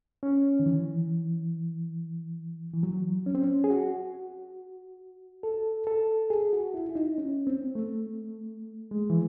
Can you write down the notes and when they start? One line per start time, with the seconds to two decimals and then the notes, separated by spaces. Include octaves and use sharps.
0.23 C#4
0.60 D#3
0.66 E3
2.73 E3
2.83 F#3
3.26 C#4
3.35 C4
3.42 C#4
3.64 G#4
3.70 F#4
5.43 A4
5.87 A4
6.30 G#4
6.53 F#4
6.74 E4
6.89 E4
6.95 D#4
7.18 C#4
7.47 C4
7.75 A3
8.91 G#3
9.10 E3